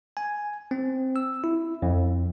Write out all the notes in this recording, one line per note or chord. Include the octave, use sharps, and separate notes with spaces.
G#5
C4
E6
E4
F2